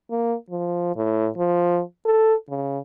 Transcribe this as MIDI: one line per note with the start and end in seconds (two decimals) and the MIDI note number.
0.11 0.35 58
0.50 0.95 53
0.96 1.29 45
1.37 1.81 53
2.06 2.34 69
2.49 2.79 49